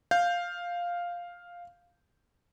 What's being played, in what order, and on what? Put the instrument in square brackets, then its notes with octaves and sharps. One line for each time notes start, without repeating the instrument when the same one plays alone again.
[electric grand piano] F5 G6